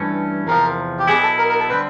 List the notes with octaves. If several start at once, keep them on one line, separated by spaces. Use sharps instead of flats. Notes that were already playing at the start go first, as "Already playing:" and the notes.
Already playing: G2 E3 A3 C#4
E2 C3 F3 A#4
G4
B2 F#3 B3 E4 G#4
A4
A#4
A#4
A4
D3 G3 C4 B4